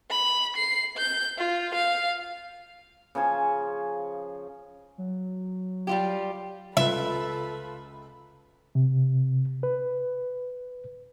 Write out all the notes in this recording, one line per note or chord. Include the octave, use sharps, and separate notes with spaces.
B5
C7
G6
F4
F5
C#3 F3 C5 G#5
F#3
G3 F4 G4
C#2 F4 A4 B4 E5 B5
C3
B4